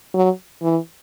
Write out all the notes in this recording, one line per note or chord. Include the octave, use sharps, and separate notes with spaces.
F#3
E3